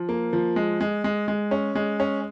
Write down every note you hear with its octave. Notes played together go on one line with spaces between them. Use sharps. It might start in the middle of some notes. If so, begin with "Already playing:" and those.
Already playing: F3
A#3
F3
G#3
G#3
G#3
G#3
C#4
G#3
C#4